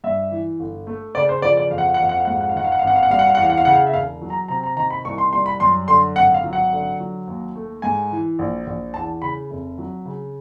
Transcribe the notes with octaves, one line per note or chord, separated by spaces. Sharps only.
G2 E5
E3
G1
A3
C#3 D5
C5
F3 D5
D5
F2 F5
F#5
F5
F#5
F2 F5
F#5
F5
G#2 F#5
F5
F#5
F5
D#3 F#5
F5
F#5
G#1 F5
F#5
F5
F#5
G3 F5
F#5
F5
E2 F#5
F5
F#5
F5
C#3 F#5
F5
E5
E1 F5
F#3
A#5
C3 A#5
A#5
D#3 A#5
B5
C2 C#6
C6
G3 C6
B5
F#2 C6
D3 C6
G#1 F#5
F5
F#3
F#5
D3
F#3
D#2
A3
G#2 G#5
E3
A#1
A#1
E2 A5
C#3 B5
F1
F#3
C#3